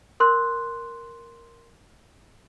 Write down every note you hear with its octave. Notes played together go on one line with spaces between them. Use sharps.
A#4 C6 F#6